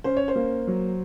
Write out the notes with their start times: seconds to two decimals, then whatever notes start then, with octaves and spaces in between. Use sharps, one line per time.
0.04 C#4 C5
0.17 C#5
0.28 C5
0.36 A#3
0.67 F#3